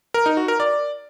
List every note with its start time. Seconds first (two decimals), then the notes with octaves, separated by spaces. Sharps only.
0.14 A#4
0.26 D#4
0.37 F#4
0.48 A#4
0.60 D5